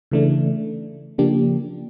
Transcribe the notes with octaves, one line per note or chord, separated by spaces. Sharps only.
C#3 E3 A3 D4
C#3 F3 A#3 D4 G4